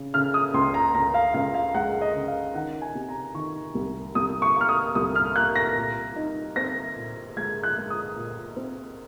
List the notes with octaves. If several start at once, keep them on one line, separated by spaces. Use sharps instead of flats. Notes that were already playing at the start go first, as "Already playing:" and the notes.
Already playing: C#3
C#3 F6
D#6
C#2 C6
A#5
C#2 A#5
F5
C#2 F5
F5
G#3 F#5
D#5
C#3
F5
D#3 F#5
G#5
C3
A#5
D#3 C#6
C2
C2 D#6
C#6
A#3 F6
D#6
C2 D#6
F6
A#3 F#6
A#6
A#2
D#4
C4 A#6
A#2
G#3 G#6
F#6
G#3
D#6
A#2
C4